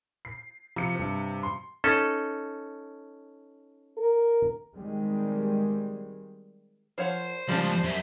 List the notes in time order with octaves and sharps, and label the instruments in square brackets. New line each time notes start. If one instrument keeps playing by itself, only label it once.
[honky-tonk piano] C7
[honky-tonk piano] C3 C#7 [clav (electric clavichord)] F3
[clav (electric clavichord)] G2
[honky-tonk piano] C6
[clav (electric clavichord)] C#4 D#4 A4
[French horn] A#4
[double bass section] D#3 G3 G#3 C4
[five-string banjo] F3 C#5 F#5 [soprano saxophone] C5
[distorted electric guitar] C#2 F3 [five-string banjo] G3 C#4 A5
[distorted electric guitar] F#2 E5